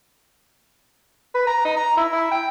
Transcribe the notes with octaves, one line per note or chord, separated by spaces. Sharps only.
B4
A#5
D#4
A#5
E4
E4
G5